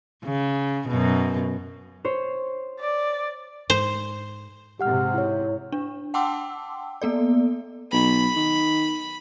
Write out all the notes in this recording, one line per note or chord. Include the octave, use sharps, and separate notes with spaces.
C#3
F#2 B2
C5 C#5
D5
G#2 C5
G#2 C3 G4 F#5 F6
E4 C#5
D4
F#5 G5 A5 C6 D6 E6
A#3 B3 A4 D5
B1 B5
D#3